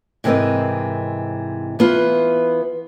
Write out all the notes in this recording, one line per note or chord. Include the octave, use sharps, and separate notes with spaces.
G#2 C3 E3 C4 A#4 D#5
E3 B3 F4